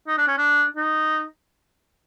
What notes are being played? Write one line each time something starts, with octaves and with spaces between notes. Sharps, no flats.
D#4
D4
C#4
D4
D#4